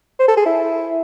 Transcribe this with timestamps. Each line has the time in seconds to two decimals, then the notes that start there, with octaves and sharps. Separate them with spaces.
0.19 C5
0.28 A4
0.37 G#4
0.46 E4